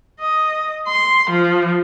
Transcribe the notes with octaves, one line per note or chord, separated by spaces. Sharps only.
D#5
C6
F3